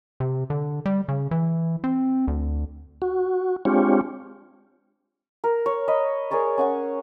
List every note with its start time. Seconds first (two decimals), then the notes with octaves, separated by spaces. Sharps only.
0.20 C3
0.50 D3
0.86 G3
1.08 C#3
1.31 E3
1.84 C4
2.28 D2
3.02 F#4
3.65 G#3 C4 D4 F4 G4 C#5
5.44 A#4
5.66 C#5
5.88 D#5 B5
6.31 G#4 A#4 C#5 D5
6.58 C#4 F#5 C#6